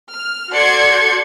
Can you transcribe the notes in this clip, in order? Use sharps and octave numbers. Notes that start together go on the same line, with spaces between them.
F6
F#4 A4 D5 C6 G#6 C#7